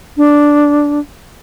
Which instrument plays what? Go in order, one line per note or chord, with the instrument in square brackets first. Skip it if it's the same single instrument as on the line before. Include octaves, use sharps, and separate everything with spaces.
[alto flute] D4